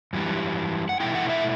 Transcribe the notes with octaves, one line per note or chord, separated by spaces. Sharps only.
F#2 E3 G3
F#5
B2 A3 E4 G5
F#5
E5